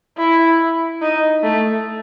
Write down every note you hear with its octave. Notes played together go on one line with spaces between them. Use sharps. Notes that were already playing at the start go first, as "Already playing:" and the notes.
E4
D#4
A3